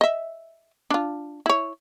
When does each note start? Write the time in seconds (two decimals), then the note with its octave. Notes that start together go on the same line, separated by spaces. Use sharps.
0.01 D#5 E5
0.91 D4 F4
1.46 E4 C#5